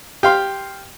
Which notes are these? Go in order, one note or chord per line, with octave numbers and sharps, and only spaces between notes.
G4 F5 C6